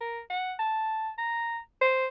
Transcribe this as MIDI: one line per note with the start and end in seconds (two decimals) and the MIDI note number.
0.01 0.19 70
0.30 0.53 78
0.59 1.10 81
1.18 1.58 82
1.81 2.06 72